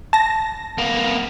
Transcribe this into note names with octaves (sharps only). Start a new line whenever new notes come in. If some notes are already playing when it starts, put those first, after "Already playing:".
A5 A#6
A#3 B3